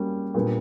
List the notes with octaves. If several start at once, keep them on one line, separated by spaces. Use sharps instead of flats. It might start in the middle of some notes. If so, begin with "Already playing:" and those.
Already playing: G3 A#3 C#4 F#4
A#2 G3 B3 D4